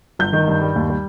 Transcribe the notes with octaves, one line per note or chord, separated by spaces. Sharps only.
G1 G6
D#3
G2
G3
D#2
G3